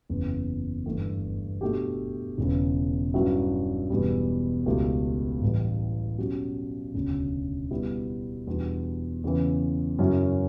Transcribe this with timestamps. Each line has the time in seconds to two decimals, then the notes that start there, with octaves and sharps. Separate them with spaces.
0.09 F#1 E2 C#3
0.86 G1 G2 E3 A3
1.61 B2 A3 D4 G4
2.38 E1 E2 C#3
3.14 G2 F#3 C#4 E4
3.90 E1 E2 B2 G3
4.66 C#2 B2 A3 E4 G4
5.42 A1 A2 E3 G3
6.18 B2 F#3 C#4 G4
6.94 E1 D2 C#3
7.71 B2 G3 B3 E4 G4
8.47 E2 B2 G3 D4
9.24 E2 C#3 E3
9.99 F#2 C#3 F#3 C#4 E4